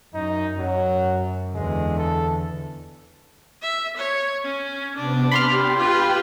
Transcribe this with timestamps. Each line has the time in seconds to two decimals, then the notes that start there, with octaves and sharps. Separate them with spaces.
0.14 F#2 D#4
0.59 F#2 F#3
1.55 E2 D3 G#3
1.98 A4
3.62 E5
3.98 C#5
4.45 C#4
4.97 C3 B3 D4 D5
5.31 G4 B5 C6 F6
5.76 F4 B4